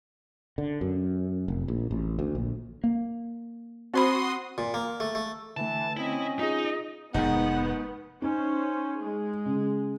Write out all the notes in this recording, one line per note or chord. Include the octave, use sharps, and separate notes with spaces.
D3
F#2
F1
A#1
A1
D2
A#1
A#3
C4 F#4 C5 B5 C6 D#6
A#2
A#3
A3
A3
D3 E3 A3 A5
C4 C#4 E4 D#5
D#4 F4 G#4 D#5
F1 G#2 D#3 G#3 B3 D#4 F#5
C#4 D#4 C5
G#3 G#4
C#3